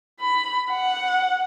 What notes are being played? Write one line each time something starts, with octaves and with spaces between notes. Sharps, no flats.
B5
F#5